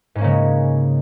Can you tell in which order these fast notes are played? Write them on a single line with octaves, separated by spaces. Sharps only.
G#2 C#4 A#3 C#3 G#3